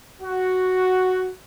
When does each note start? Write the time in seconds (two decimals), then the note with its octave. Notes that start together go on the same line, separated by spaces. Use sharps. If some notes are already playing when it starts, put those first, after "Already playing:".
0.21 F#4